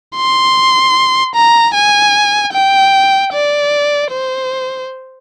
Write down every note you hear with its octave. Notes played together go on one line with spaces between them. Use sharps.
C6
A#5
G#5
G5
D5
C5